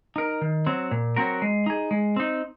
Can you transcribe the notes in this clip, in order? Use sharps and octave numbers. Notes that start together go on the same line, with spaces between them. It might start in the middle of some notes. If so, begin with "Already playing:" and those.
D#4 A#4
D#3
F#3 C4
A#2
F#3 C4 F#4 A#4
G#3
D#4 G#4
G#3
C4 D#4